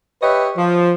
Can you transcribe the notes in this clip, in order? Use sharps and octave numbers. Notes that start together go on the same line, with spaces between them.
G4 B4 C#5 D#5 E5
F3